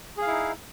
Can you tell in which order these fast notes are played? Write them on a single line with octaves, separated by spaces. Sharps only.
G#4 F5 E4 D#4